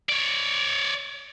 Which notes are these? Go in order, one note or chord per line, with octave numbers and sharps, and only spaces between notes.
C#5 D5